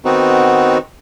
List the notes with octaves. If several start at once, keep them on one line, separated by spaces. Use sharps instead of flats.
D#3 B3 C4 D#4 F#4